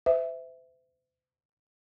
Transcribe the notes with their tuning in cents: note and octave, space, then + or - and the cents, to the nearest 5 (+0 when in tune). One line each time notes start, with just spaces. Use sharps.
C5 -45 E5 +0